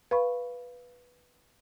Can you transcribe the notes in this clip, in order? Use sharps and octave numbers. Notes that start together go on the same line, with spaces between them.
B4 F5 B5 C#6